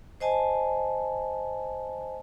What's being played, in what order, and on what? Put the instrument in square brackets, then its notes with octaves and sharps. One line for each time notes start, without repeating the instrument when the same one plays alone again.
[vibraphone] C5 D#5 G#5 A5